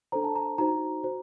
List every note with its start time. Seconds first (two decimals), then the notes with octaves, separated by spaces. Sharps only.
0.12 D4 A4 C5 A#5
0.24 A5
0.36 A#5
0.58 D#4 F#4 C5 A#5
1.03 F#4 C5